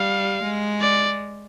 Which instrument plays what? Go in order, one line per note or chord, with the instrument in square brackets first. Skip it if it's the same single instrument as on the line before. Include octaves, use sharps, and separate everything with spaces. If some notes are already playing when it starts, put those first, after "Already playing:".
Already playing: [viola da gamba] G3 [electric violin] F5
[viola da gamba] G#3
[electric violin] D5